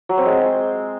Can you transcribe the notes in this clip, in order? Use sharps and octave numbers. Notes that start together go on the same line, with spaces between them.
F#3
C4
G#3